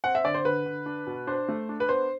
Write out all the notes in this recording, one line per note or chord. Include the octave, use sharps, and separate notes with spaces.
C4 F#5
E5
D3 D5
C5
D3 B4
D3
D4
B2
D4 C5
A3
D4
B4
B3 C5